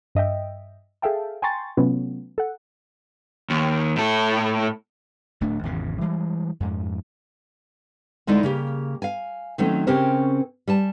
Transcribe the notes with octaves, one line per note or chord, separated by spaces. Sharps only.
G2 D#5 E5 G5
G#4 A4 E5 F5 G5 A5
G5 G#5 A#5 C6 C#6 A6
C3 F#3 A3 B3 C#4 F4
A4 F#5
D#2
A2 A4
D1 A2 A3 D4
G#1 E2 C#3
E3 G3 G#3
F2 G#2
D2 G#3 D#4 E4 D5
C#3 A#3 G4
F5 G#5
D#3 F#3 A3 C4 C#4
C#3 C4 C#4 G4 A#4 C5
G3 G#5 A5